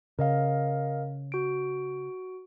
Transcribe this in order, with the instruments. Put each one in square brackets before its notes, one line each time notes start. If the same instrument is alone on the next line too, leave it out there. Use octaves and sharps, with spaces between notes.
[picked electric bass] C#3 [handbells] A#4 D#5 F5
[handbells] F#4 D7